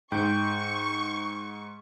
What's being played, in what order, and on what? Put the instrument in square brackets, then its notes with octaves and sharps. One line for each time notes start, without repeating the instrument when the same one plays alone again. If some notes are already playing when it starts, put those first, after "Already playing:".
[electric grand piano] G#2 [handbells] G5 G6 [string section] C#6